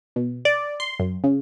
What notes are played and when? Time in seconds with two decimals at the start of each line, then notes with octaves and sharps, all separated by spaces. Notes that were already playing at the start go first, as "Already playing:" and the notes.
0.16 B2
0.45 D5
0.80 C6
1.00 F#2
1.24 C#3